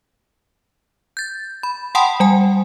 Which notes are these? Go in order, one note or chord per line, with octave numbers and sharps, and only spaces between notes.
G6 A6
B5
F#5 G5 A5 B5 C6 D#6
G3 G#5